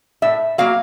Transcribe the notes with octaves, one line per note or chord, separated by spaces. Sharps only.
A2 E5
F#3 A#3 F5